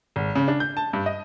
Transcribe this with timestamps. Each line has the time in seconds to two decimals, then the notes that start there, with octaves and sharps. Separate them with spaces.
0.16 G#1
0.35 C#3
0.48 D4
0.60 G6
0.77 A5
0.93 G2
1.06 D#5